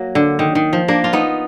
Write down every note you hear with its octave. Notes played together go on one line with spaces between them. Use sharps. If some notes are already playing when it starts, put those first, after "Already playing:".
Already playing: F#3 A#3
D3
D#3
D#3
F3
A#3 D4
F4
B3 D#4